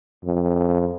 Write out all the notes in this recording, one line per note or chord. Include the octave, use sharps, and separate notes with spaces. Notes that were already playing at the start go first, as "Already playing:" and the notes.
F2